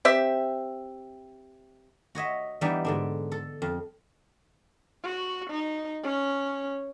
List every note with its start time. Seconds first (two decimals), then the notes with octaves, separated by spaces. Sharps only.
0.05 C4 G4 E5
2.15 F#4 C#5 D#5 E5
2.61 E3 G3 B3 D4 D#4
2.85 G#2 D3 D4
3.32 A4
3.62 F2
5.03 F#4
5.50 D#4
6.03 C#4